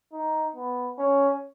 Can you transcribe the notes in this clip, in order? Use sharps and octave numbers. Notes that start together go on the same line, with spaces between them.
D#4
B3
C#4